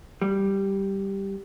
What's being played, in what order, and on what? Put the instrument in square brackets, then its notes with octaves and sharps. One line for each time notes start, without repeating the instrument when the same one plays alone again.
[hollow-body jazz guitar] G3